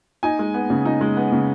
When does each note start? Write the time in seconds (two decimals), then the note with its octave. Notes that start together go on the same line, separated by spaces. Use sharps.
0.23 D#4 G#5
0.39 G#3
0.54 B3
0.70 C#3
0.85 D#4
1.01 G#3
1.17 B3
1.32 C#3